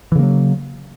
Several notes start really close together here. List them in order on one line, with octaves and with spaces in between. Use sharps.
E3 C#3 A#3 F#3